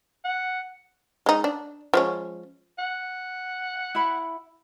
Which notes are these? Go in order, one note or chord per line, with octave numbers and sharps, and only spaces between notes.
F#5
G#3 D#4
D4
F3 G#3 C#4
F#5
E4 B5